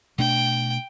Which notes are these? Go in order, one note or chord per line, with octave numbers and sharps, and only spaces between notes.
B2 A3 D4 G5